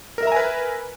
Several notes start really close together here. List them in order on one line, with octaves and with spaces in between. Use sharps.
A#4 E5 A#5 G#5 B4